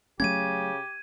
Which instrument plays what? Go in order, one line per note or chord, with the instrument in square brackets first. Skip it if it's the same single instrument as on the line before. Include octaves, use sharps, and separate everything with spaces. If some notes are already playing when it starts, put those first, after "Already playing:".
[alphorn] C#3 [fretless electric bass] F#3 A3 C#4 [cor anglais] G4 [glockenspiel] G#6 D#7